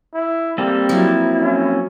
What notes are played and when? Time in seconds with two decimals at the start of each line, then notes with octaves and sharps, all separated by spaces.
0.14 E4
0.58 G3 A#3 C4 A4
0.89 F3 F#3 E4
1.41 C#4